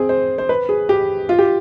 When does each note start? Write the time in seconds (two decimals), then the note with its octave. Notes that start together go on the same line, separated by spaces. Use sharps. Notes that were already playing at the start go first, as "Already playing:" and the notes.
Already playing: C4 G#4
0.09 C5
0.38 C5
0.49 B4
0.69 G#4
0.89 G4
1.29 F4
1.39 G4